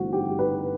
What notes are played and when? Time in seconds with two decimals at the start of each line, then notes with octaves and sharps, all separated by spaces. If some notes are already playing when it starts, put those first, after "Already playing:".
Already playing: G1 G2 E3 A3 C4 F#4
0.13 G4
0.39 B4